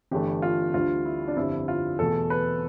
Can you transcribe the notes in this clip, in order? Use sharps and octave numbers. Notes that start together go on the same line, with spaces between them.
G1 G2 E3 A3 G4
F4
D2 D3 G3 F4
E4
D4
G1 F2 D3 G3 E4
F4
E2 B2 A3 A4
B4